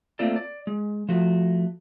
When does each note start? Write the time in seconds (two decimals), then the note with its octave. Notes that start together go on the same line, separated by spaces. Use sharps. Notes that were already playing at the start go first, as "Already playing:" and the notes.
0.19 A3 A#3 C4 F4 A4 D5
0.36 D5
0.67 G#3
1.09 F3 A3 F#4